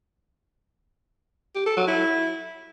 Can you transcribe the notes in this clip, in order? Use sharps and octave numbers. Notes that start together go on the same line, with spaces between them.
G4
A4
F#3
E4